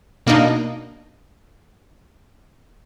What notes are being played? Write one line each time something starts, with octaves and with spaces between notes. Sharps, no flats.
B2 A#3 D4 D#4